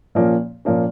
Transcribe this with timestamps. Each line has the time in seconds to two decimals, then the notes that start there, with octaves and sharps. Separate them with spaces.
0.15 A#2 F3 A#3 C#4
0.65 A#2 F3 A#3 C#4